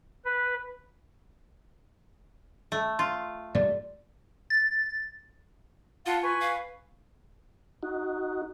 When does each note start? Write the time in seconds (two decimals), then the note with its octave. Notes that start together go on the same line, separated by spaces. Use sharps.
0.25 B4
2.72 A3
2.99 F4 C6
3.55 G2 G3 A3 D5
4.50 A6
6.06 F4 F5 F#5 A5
6.23 B4 G#5 C#6
6.40 F5
7.83 D#4 F#4